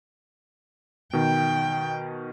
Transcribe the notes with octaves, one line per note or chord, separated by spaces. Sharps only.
B2 D#3 G5